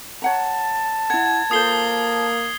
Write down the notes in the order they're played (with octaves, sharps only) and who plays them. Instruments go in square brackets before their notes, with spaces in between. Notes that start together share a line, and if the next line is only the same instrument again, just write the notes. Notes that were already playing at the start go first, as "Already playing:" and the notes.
[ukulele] C#5 F#5 A#5 [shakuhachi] A5
[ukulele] E4 F#5 [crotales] G#6
[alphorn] A#3 [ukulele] F4 A4 C5 [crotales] D#6 C7 G7